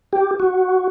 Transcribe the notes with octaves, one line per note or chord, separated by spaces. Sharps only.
G4
F#4